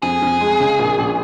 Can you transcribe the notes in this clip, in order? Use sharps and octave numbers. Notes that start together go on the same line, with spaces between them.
F2 G#4
F2
G#3
C#3
A#1
A#1